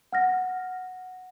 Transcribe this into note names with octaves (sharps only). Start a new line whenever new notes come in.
F#5 F6 A#6